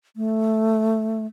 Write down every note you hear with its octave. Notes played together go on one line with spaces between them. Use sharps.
A3